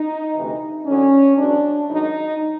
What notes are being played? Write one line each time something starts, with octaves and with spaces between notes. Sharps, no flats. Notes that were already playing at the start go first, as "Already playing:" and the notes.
Already playing: D#4
D2 C3 E3
F2 D3 F#3 C#4
E2 B2 F#3 D4
G#2 D#3 F#3 D#4